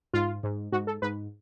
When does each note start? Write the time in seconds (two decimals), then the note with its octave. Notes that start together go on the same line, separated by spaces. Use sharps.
0.13 G#2 F4
0.43 G#2
0.72 G#2 F#4
0.87 A4
1.02 G#2 B4